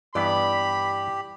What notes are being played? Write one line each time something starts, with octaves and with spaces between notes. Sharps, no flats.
G2 E3 B3 G4 D5 B5